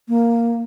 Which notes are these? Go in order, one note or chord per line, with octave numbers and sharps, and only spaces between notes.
A#3